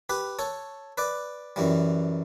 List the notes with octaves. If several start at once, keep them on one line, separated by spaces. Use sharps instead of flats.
G4 B4
A4 C#5
B4 D5
F#2 E3 G3